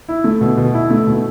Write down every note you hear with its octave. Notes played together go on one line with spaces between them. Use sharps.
E4
A3
B2
B2
E4
A3
B2